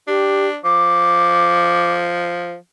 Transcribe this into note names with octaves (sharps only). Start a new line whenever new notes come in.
D4 G4
F3 D6